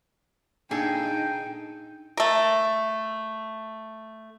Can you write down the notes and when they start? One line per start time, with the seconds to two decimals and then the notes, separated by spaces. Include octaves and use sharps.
0.71 A#2 D4 D#4 G#4 A4 G5
2.17 A3 A#4